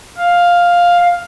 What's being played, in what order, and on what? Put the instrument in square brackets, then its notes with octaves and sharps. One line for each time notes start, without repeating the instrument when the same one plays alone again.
[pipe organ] F5